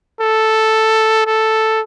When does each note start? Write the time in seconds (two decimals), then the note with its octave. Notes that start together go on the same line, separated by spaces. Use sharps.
0.21 A4
1.26 A4